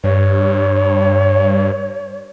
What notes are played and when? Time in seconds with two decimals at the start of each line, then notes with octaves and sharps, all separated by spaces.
0.04 G2 C#5